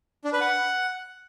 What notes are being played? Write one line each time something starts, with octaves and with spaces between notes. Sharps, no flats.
D4
B4
F#5